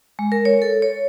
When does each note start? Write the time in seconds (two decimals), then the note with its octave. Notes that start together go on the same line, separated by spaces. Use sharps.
0.19 G#3
0.32 A#4
0.45 C#5
0.62 A4
0.82 C#5